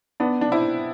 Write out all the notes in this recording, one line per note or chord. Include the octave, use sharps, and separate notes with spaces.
B3 D4
D4
C4 E4